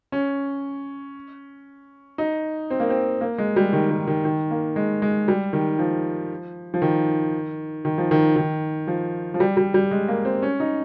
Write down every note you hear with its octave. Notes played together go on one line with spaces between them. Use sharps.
C#4
D#4
C4
A#3
C4
A#3
G#3
G3
D#3
D#3
D#3
D#3
A#3
G#3
G#3
G3
D#3
F3
F3
D#3
D#3
F3
D#3
D#3
F3
F3
G3
G3
G3
G#3
A#3
C4
C#4
D#4